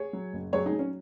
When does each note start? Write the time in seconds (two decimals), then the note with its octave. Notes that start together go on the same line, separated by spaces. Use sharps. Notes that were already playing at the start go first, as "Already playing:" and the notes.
Already playing: G#4 C#5
0.13 F#3
0.33 F#1
0.53 F#3 G#4 C#5
0.66 D#4 G#4
0.72 F#3
0.79 C#4